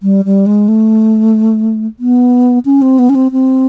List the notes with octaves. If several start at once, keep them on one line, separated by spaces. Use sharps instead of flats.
G3
G3
G#3
A3
B3
C#4
C4
B3
C#4
C4
C4